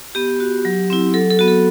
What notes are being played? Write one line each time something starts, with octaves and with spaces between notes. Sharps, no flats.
B3 G4
F#4
F#3
C4 E4
F#3 A4
A4
B3 F#4
A4